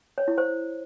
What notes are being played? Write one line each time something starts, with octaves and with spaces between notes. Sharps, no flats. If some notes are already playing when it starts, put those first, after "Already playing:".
C#5
E4
C5